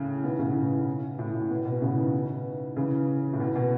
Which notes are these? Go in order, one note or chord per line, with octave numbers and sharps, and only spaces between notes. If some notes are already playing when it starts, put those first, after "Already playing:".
Already playing: A2 C#3
B2 D#3
A2 C#3
A2
A2
A2
B2
B2
A2 C#3
B2 D#3
C#3 E3
A2
B2
B2